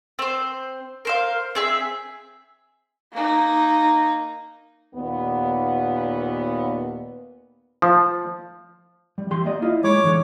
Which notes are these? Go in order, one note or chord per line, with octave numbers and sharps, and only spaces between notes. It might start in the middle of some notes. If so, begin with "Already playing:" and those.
C4 C5
A#4 C5 F5
C4 G#4 E5
A#3 D#4
D#2 A#2 B3
F3
G3
E3 G4 C6
A#3 D5 D#5
E4 F4 D#5
G#3 C#5 B5 D6
D3 E3